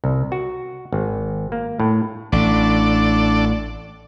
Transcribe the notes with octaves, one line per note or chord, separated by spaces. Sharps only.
C2
F#4
G#1
A#3
A2
A1 D4 A4 D5